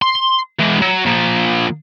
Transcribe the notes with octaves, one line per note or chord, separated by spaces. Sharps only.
C6
E3 G#3
F#3
F3 A#3